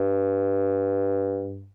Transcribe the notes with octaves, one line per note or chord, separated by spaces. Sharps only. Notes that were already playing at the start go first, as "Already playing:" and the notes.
Already playing: G2